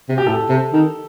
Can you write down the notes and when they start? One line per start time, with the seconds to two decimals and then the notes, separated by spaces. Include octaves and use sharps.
0.09 C3
0.18 G4
0.27 A2 A4
0.49 C3
0.73 D#3